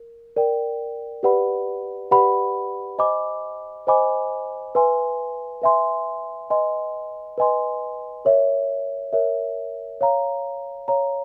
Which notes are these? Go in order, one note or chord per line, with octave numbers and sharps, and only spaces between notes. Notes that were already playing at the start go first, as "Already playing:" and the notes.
Already playing: A#4
A#4 D5 G5
G4 B4 D5 F#5 B5
G4 B4 D5 F#5 B5
C5 D#5 G#5 B5 D6
C5 D#5 G#5 B5 D6
B4 E5 G#5 C6
B4 E5 G#5 C6
B4 D#5 G#5 C6
B4 D#5 G#5 C6
A#4 C#5 E5
A#4 C#5 E5
C#5 F5 A#5
C#5 F5 A#5